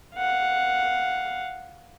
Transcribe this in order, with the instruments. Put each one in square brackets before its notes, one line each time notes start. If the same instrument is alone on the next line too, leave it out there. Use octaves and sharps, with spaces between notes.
[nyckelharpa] F5 F#5